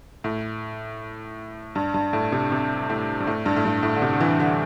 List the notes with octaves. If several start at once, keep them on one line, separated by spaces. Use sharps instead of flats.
A2
G2
G2
A2
C3
C3
A2
G2
A2
G2
A2
G2
A2
D3
C3
D3
E3
D3